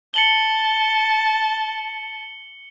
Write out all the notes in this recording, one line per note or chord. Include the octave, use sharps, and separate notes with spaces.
A5 C#7 F#7 G7